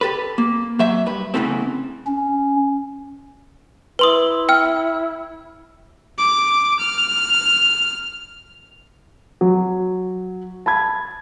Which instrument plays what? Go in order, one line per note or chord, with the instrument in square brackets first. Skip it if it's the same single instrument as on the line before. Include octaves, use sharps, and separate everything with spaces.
[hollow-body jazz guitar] G4 A4 B4
A#3
F#3 C5 E5
G2 B4
E2 C#3 E3 A3 C4
[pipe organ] C#4
[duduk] E4 [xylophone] B4 C6 D#6
[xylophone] G5 F6
[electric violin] D6
F6
[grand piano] F#3
A5 B5 G#6